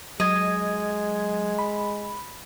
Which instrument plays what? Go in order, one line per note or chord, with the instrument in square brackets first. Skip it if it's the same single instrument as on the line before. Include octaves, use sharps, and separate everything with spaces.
[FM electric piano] F#3 G#6 [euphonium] G#3 [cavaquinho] D#5
[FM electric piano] B5